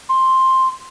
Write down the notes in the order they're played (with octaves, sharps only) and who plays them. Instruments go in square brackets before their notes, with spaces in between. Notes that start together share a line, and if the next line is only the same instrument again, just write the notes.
[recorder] C6